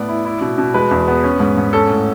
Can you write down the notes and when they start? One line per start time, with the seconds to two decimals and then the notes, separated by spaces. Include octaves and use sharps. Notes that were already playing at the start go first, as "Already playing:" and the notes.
Already playing: A2 B3 D5
0.09 E4
0.25 E4
0.41 B2
0.58 B2
0.74 G#3 B4
0.91 E2
1.08 B3
1.24 C#4
1.40 G#2
1.57 G#2
1.73 C#4 A4
1.90 A2